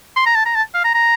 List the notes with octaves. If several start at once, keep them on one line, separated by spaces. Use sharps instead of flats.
C6
A#5
A5
A#5
A5
F5
A#5
A#5